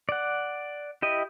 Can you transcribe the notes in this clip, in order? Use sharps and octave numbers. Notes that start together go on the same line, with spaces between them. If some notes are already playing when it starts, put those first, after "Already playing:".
D5 F#5
E4 G4 D#5